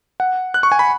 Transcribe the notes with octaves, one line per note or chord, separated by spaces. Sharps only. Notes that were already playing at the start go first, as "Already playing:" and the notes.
F#5
F#6
C#6
G#5
B5